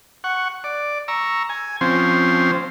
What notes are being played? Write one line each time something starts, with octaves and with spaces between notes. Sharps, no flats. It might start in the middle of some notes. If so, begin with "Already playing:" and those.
F#5 C#6
D5
A#5 C#6 E6
G#5
F3 C4 C#4 C5